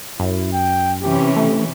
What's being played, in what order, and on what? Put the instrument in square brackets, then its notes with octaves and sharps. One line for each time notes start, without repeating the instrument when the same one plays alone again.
[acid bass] F#2 [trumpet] E4
[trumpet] G5
[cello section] C3 E3 C#4 [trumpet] G4
[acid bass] A3 [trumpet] G4